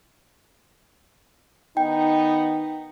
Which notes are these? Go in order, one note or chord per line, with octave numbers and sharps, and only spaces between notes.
D#3 B3 D#4 G5